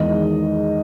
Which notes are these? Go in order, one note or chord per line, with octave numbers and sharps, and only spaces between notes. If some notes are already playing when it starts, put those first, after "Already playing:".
Already playing: E2 D#3 G#3 D#5